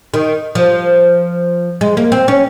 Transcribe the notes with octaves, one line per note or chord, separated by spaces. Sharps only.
D#3
F3
G#3
A#3
C4
C#4